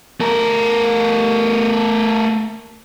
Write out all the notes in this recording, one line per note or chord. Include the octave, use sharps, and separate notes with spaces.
A3 A#4